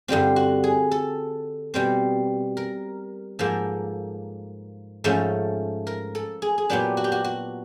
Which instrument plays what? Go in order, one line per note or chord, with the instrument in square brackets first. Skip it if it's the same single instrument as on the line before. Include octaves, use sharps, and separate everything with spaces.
[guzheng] G2 D3 G3 C4 F4
F#4
G#4
A4
B2 G3 C4
A#4
G#2 F3 A#3 A4
G#2 F3 A3 C#4 A4
A#4
A4
G#4
G#4
A#2 F#3 B3 D4 G4
F#4
G4
F#4
F#4